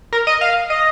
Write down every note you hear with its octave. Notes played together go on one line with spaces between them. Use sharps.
A#4
D#5
F5
D#5